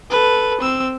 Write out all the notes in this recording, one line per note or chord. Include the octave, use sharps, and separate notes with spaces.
A4 B4
C4 E6